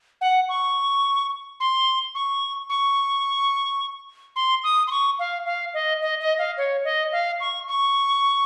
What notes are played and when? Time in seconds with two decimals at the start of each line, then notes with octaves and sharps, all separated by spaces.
0.21 F#5
0.49 C#6
1.60 C6
2.15 C#6
2.70 C#6
4.36 C6
4.64 D#6
4.87 C6
4.91 C#6
5.19 F5
5.46 F5
5.74 D#5
6.02 D#5
6.21 D#5
6.39 F5
6.58 C#5
6.84 D#5
7.12 F5
7.40 C#6
7.68 C#6